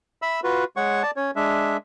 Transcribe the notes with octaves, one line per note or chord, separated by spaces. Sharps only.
E5 B5 E6
F4 F#4 B4
G#3 C#5 F#5 C#6
D5 A5
C#4 C#5
G#3 D4 E5